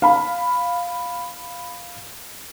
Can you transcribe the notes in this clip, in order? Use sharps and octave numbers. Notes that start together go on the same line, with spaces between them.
F5 B5